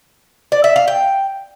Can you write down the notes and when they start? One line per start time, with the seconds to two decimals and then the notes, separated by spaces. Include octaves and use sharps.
0.52 D5
0.64 E5
0.76 F5
0.88 G5